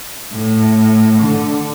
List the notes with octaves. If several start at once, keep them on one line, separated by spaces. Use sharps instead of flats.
A2
D3